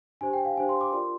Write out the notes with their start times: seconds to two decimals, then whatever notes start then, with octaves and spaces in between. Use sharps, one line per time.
0.21 D4 G4 C5 G#5
0.33 G5
0.45 F5
0.57 D4 G4 C5 G#5
0.69 C6
0.81 D6
0.92 F4 A#4 D5 C6